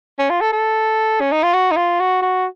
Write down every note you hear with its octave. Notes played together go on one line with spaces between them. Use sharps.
C#4
F4
A4
A4
C#4
D#4
F4
F#4
D#4
F4
F#4
F#4